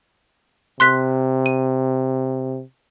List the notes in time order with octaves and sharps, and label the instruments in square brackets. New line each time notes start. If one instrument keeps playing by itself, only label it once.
[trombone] C3 [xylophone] C6 F#6 B6
[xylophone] D#7